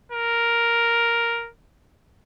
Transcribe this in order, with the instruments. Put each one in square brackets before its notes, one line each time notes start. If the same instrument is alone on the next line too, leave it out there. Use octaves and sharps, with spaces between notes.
[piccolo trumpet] A#4